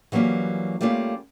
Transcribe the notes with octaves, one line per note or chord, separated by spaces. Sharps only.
E3 F#3 G3 A#3 C#4
G3 A3 A#3 C#4 F4